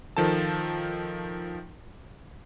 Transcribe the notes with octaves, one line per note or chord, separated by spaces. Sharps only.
D#3 F3 A4 A5